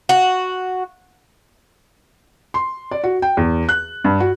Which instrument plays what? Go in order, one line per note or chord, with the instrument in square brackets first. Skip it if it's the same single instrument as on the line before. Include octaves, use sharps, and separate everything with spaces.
[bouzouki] F#4
[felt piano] C6
D5
F#4
G5
E2
F#6
G2
F#4